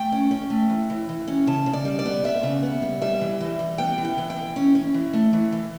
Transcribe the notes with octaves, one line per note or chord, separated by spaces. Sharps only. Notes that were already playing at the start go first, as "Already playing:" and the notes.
Already playing: A3 G5
C#4
C#4
A3
E3
E3
E3
C#4
C#3 A5
C#3
D5
G3
D5
B3
B3 E5
C#3
B3
G3
G3 E5
E3
E3
G3
B3 G5
E3
G5
E3
G5
E3
C#4
C#4
E3
A3
E3
E3